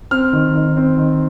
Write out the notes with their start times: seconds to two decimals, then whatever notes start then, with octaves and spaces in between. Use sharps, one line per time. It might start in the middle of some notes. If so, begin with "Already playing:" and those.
0.11 C4 F6
0.33 D#3
0.55 D#3
0.77 C4
0.97 D#3